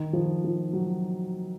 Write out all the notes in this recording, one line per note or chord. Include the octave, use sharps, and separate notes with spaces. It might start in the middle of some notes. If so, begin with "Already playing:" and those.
Already playing: D#3
F3
F3
F#3